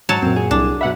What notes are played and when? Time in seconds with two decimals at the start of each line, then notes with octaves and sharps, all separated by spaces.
0.09 G#2 F#3 C#5 A5
0.22 F#2 A#2 C4
0.36 G#4
0.51 C2 D4
0.81 F#2 B2 E5 F#5 B5